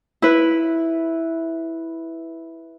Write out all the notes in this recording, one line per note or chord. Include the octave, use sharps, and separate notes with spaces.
E4 B4